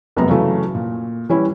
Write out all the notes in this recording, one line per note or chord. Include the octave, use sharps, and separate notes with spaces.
F1 F#2 C3 G#3 B3 A#5
C#3 E3 F#3 A3
A#2
E3 G3 C#4 E4